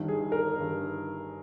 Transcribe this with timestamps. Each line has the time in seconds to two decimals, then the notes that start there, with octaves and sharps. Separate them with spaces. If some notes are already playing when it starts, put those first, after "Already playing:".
Already playing: G1 G2 D#3
0.08 G#4
0.32 A#4
0.57 G1 G2 D#3